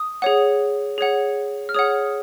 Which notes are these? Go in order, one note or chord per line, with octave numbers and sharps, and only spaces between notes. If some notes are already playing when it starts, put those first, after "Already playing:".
Already playing: D#6
G#4 C#5 F#5
G#4 C#5 F#5
F6
G#4 C#5 F#5 D#6